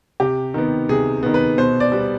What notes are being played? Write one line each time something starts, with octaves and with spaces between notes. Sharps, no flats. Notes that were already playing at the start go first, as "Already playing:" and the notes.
C3 G4
D#3 B3
C3 G#4
D#3 B3
B4
B2 C5
D5
G3 B3